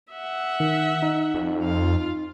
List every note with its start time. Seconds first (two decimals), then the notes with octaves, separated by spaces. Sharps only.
0.13 E5 F#5
0.60 D#3
1.02 D#4
1.34 F2
1.63 F4 F5